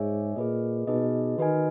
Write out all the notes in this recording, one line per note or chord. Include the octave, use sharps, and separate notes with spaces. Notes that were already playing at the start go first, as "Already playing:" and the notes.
Already playing: G#2 G#4 C#5 E5 G#5
A#2 G#4 B4 D#5
B2 D#4 G#4 B4 D#5
D#3 F#4 B4 D#5 G#5